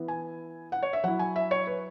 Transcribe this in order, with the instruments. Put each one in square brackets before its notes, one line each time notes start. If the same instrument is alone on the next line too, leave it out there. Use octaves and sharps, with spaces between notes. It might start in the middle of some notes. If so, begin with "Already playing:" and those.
Already playing: [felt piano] E3 B3 E4
G#5
F#5
C#5
E5
F#3 E4 F#5
G#5
E5
C#5
B4